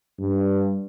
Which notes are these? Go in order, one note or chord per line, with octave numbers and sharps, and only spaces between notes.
G2